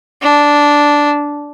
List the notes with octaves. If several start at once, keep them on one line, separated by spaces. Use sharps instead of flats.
D4